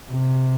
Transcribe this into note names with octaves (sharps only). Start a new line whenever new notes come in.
C3